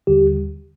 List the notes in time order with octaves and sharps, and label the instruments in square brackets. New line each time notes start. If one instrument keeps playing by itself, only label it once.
[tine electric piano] D#2 D3 G3 G4